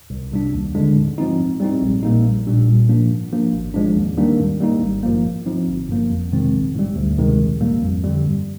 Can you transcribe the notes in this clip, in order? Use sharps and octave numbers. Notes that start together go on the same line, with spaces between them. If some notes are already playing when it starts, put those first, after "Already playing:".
C2
C3 G3 D4
D#2
D3 G#3 D4
G#2
F3 C4 D#4
G#2
G3 C4 D#4
A#1
A#2 G3 A#3 D#4
A#1
A#2 G3 D4
A#2
F3 A#3 D4
G#2
F3 A#3 D4
G#1
G#2 F3 G#3 D4
D#2
D#3 G3 A#3 D4
G#2
G3 A#3 D#4
G#1
G2 F3 A#3
G#2
F3 C4 D#4
G1
G2 F3 A#3
F2
C3 D#3 G#3 C4
A#1
G#2 G3
D2
C3 D#3 G#3
A#1
G#2 G3 A#3
F2
D3 G3
G2